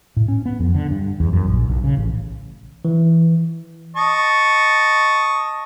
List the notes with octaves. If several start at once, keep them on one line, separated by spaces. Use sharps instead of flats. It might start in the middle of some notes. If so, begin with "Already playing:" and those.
A2
C#4
B3
F2
D3
G2
E2
F#2
A#1
B1
C#3
A1
E3
D#5 A5 C#6